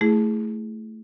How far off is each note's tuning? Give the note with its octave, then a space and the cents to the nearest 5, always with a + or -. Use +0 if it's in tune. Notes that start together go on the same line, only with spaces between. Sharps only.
A3 +0 E4 +0 G#4 +0